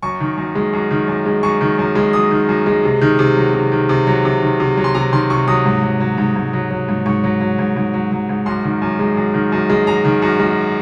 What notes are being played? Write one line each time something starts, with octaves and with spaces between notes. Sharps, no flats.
F#2 C#6
D#3
F#2
G#3
F#2
D#3
F#2
G#3
F#2 C#6
D#3
F#2
G#3
F#2 D#6
D#3
F#2
G#3
C3
D#3
C3
F#3
C3
D#3
C3
F#3
C3
D#3
C3
F#3
C6
C3 A#5
D#3 C6
C3 C#6
F#3 D#6
G#2
F#3
F#3
G#2
G#2
F#3
F#3
G#2
G#2 C#6
F#3
F#3
G#2
G#2
F#3
F#3
G#2
F#2 C6
D#3
F#2
G#3
F#2
D#3
F#2
G#3
F#2 A#5
D#3
F#2
G#3